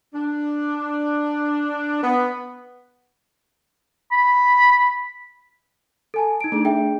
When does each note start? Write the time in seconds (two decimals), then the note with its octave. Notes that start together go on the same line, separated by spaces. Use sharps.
0.14 D4
2.03 B3
4.11 B5
6.14 A4 G#5 A5
6.41 D#4 D7
6.52 A3 D4 G#4
6.65 G#4 E5 G5